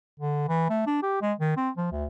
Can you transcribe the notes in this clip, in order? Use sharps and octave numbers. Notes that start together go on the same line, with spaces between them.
D3
E3
A3
D4
G4
G#3
D#3
C4
F3
D2